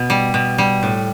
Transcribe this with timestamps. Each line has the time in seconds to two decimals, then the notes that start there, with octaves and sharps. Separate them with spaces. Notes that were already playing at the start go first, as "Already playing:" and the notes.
Already playing: B2
0.10 G3
0.34 B2
0.58 G3
0.83 A2